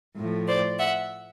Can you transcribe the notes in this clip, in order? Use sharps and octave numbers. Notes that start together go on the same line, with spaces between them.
A2 F3 A3
C5 D5
E5 F#5